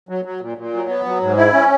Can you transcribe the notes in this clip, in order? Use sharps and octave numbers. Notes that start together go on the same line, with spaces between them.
F#3
F#3
A#2
A#2
F#3
B3
F#3
G#2
E4
C#4